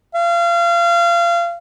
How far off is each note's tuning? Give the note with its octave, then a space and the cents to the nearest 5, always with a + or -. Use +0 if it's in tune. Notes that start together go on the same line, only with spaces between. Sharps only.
F5 -30